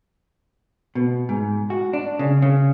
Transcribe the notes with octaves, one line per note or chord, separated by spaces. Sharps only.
B2
G#2
F#4
D4
C#3
C#3